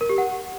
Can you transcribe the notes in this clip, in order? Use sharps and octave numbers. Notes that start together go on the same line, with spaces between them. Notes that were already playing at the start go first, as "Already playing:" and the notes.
A#4
G4
F#5